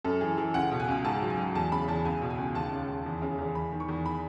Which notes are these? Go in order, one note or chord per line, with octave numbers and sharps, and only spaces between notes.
F#2 A4
E3 G#4
E3 G#4
C#2 F#5
B2
G#5
C#2
G#2 A5
F#3
G#5
F#3
E2 A5
C#3 B5
E2 A5
C#2 G#5
B2
G#5
C#2
D#2 A5
C#3
D#2
E2
C#3
E2
E2 B5
D#3
C#6
E2
B5